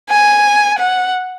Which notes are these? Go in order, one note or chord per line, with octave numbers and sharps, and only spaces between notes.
G#5
F#5